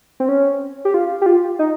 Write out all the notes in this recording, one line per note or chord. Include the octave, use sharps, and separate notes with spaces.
C4
C#4
G4
F4
G4
F4
D#4